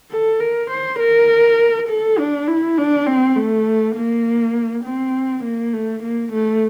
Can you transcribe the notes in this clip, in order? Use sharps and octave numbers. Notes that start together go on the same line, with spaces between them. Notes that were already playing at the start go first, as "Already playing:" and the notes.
A4
A#4
C5
A#4
A4
D4
E4
D4
C4
A3
A#3
C4
A#3
A3
A#3
A3